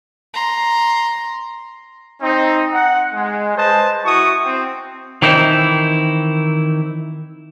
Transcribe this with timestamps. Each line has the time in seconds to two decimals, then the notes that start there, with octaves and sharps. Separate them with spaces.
0.34 A#5 C6
2.21 C4 D#4
2.73 F#5
3.14 G#3
3.56 B4 C5 D#5 A5
4.05 E4 F#4 C#6 D#6
4.44 C4
5.22 D#3 E3 C4 D#4 E4